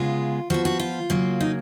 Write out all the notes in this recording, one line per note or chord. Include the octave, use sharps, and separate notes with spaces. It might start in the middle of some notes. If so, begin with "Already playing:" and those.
Already playing: C#3 G#3 B3 F4
F3 B3 F#4
F#4
F4
C#3 F#3 A#3
D#4